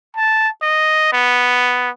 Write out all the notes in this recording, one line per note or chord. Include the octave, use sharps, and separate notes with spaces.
A5
D#5
B3